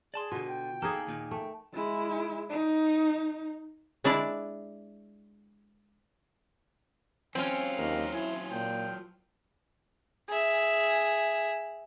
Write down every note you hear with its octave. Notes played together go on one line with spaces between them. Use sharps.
G#4 D5 A5 C6
B2 D3 F4
G5
A#3 D#4 G#4 A4
D#2 A#2 D#3
A3 G5
G#3 E4
D#4
G#3 D4 E4 D5
F#3 C4 C#4 F4 G#5
D#2 A#4
E4 G#5
A#2 G5
G#4 E5